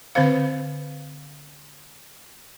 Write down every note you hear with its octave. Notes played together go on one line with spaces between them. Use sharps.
D3 C4 B4 C5 F5